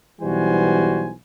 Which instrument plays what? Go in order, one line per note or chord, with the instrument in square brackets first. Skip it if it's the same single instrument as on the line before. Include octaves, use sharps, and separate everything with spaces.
[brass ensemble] B1 E3 G3 F#4 C5 G#5